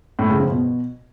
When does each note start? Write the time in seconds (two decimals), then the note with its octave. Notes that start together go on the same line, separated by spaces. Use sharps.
0.19 A2
0.29 C#3
0.40 F3
0.50 B2